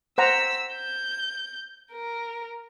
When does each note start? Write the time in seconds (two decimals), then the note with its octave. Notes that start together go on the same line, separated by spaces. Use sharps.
0.18 C5 F#5 A#5 E6 B6
0.73 G6
1.93 A#4